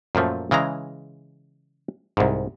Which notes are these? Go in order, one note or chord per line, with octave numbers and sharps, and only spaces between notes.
F#2 A#2 F3 A3
C#3 E3 G#3 A#5
C2 G#2